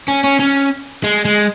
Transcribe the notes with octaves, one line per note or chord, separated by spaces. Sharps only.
C#4
C#4
C#4
G#3
G#3